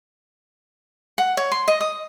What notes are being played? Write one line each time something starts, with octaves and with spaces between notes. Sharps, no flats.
F#5
C#5
C6
D#5
D#6